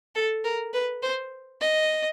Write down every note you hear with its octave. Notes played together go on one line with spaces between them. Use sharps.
A4
A#4
B4
C5
D#5